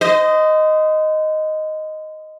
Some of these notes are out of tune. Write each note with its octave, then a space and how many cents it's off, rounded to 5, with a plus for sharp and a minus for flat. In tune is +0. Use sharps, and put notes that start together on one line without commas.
C5 -35 D#5 +0